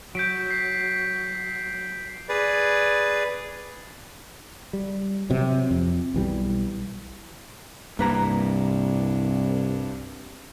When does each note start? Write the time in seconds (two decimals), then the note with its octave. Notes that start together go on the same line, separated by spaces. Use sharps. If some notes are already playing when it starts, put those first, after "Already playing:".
0.15 F#3 G6 B6 D7
0.51 B6 C7
2.29 G#4 B4 D5
4.73 G3
5.30 C3 F#3
5.71 F2
6.14 B1 E3 G3
7.99 C2 G2 A#3 B4 A#5